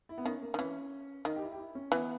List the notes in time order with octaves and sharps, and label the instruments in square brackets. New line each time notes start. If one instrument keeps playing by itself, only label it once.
[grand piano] E4
B3
[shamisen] D#3 [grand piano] C#4
[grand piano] A#3
[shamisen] D#3
[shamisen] E3 [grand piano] C#4
[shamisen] D#3 [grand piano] D#4
[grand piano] G4
E4
G4
E4
C#4
[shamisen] E3 [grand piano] B3